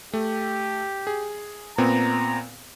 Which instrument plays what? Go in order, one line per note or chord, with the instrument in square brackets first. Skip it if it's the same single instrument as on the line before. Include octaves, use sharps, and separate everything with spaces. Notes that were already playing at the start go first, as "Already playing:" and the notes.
[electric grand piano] A3 [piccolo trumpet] G4
[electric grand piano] G#4
[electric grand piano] A#2 B3 C4 [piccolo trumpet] A#5